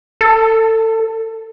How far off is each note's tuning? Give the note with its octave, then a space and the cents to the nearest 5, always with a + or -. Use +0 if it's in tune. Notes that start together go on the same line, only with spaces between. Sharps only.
A4 +25